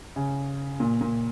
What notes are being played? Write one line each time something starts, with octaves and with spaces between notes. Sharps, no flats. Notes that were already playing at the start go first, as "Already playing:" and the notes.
C#3
A#2
A#2